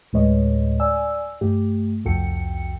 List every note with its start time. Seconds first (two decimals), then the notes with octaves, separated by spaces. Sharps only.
0.13 D2 A2 G#3 B4 C#5 D#5
0.80 D5 G#5 E6
1.41 G2 A3 G4
2.05 C2 F2 F#4 A4 G5 C#7